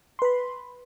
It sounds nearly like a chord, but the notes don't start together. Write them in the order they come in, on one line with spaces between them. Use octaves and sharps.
C6 B4 B5